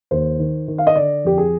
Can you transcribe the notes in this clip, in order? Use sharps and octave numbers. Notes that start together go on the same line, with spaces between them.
D#2 C5
D#3
D#3
F5
D#5
D3 D5
F2 G4
G#4